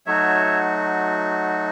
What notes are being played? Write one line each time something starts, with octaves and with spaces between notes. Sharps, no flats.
F#3 A3 D#4 F#4 C#5 E5